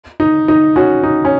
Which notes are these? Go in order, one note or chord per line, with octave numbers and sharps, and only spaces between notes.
D#4
D#4
C#4 F#4
D#4
C#4